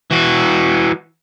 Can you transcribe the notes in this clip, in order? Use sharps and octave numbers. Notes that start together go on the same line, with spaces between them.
E3 F#4